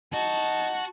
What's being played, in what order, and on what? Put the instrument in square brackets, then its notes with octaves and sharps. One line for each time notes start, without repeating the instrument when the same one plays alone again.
[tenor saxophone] D#4 [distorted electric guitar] F#4 [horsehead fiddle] A5